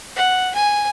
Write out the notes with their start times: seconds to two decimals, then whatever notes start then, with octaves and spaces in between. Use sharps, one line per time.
0.16 F#5
0.55 G#5